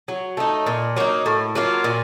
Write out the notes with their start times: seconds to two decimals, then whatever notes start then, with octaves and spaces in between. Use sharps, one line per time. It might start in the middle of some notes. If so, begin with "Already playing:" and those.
0.08 F#3
0.37 A3 D#4
0.66 A#2
0.97 F#3 A#3 D#4
1.26 A2
1.55 F#3 A#3 F4
1.84 A#2